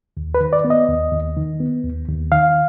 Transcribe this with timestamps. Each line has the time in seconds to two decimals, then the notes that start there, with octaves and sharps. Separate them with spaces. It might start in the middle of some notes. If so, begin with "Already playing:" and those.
0.17 D#2
0.35 B4
0.40 D#3
0.53 D5
0.64 B3
0.70 D#5
0.88 D#2
1.12 D#2
1.36 D#3
1.60 B3
1.84 D#2
2.08 D#2
2.32 D#3 F5